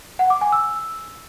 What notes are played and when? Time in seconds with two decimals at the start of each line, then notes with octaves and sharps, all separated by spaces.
0.19 F#5
0.30 D6
0.41 G#5
0.52 E6